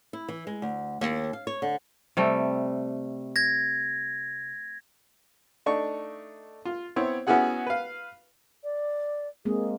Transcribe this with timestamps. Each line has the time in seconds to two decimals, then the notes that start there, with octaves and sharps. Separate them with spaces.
0.13 E4
0.29 E3
0.47 G#3
0.62 D2
1.01 D#2
1.33 F5
1.47 C#5
1.62 D3
2.17 C3 G3 A3
3.36 G#6 A#6
5.66 A3 D4 D#4 C#6
6.65 F4
6.96 B3 C4 E4 C#5
7.27 B3 C#4 E4 F#4 G#4 F#5
7.67 B4 F5
8.63 D5
9.45 G#3 A#3 C4 G#4